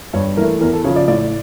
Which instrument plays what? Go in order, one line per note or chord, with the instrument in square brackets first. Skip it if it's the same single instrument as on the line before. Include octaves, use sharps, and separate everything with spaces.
[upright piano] G2 C#5
E3 A3 A#4
E2 A#4
A4
C#3 C#5
F3
D5
A2 D5